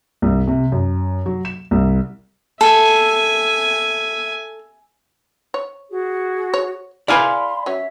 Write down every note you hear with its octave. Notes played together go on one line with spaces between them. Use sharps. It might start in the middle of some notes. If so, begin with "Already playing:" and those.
C2
C3
F#2
F#3
E7
C2
A4 E5 G#5
C#5
F#4 G#4
C#5
E4 G#4 B4 D5 F5 G#5 B5 C6
F#3 C#4 C#5 E5